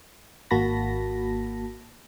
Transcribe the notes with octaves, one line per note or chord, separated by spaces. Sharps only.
G#1 A#3 F#4 A5 B5 A#6